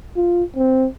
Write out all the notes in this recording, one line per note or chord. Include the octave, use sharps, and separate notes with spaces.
F4
C4